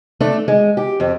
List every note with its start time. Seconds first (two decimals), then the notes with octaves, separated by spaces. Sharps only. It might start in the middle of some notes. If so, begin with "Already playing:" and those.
0.20 A3 D4
0.48 G#3
0.77 G4
1.00 F2